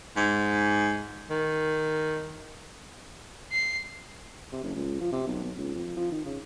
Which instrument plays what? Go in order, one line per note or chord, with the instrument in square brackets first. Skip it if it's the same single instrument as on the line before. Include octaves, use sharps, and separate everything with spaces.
[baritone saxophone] G#2
D#3
[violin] C7
[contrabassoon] C3
F#1
C#2
F3
C3
B1
B1
C#2
F2
F3
D#3
C#3